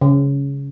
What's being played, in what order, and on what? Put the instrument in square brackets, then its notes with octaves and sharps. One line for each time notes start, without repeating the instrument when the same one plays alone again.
[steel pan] C#3